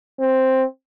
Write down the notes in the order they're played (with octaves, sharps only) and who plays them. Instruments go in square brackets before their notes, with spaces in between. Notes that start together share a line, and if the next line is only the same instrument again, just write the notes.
[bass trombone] C4